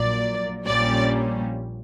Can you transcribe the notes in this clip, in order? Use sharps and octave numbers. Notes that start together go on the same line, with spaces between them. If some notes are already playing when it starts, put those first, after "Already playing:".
Already playing: A#1 A#2 F#3 A#3 D5
A#1 A#2 G3 C#4 D5